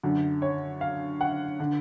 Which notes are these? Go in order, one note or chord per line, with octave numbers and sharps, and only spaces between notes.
F#2 D3
C#5
F5
F#5
D3